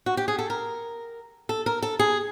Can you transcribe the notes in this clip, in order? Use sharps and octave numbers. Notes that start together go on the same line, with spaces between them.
F#4
G4
G#4
A4
A#4
A4
A#4
A4
G#4